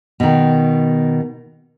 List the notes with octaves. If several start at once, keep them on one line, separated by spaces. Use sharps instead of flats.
B2 D#3